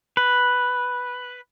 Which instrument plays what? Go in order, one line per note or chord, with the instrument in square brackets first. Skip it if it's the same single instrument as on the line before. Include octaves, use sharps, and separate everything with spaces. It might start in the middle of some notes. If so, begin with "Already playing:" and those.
[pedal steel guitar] B4